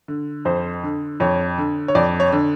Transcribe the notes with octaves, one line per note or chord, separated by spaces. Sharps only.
D3
F2 C5
D3
F2 C#5
D3
C#5
F2 D5
C#5
D3